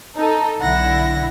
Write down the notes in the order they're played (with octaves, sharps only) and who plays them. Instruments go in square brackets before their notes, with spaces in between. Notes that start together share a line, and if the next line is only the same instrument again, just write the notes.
[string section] D#4 A4
[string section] B1 D3 E4 [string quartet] F#5 A#6